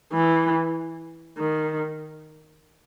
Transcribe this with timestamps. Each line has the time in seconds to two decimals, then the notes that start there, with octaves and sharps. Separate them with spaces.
0.13 E3
1.39 D#3